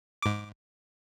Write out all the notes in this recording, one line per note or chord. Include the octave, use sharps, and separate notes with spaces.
G#2 D6